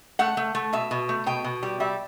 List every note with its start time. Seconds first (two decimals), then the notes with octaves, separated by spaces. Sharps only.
0.19 A3 F#5
0.37 A3
0.55 A3
0.73 B2 E5
0.91 B2
1.09 A3
1.26 B2 G5
1.44 B2
1.63 G3
1.80 G3 E5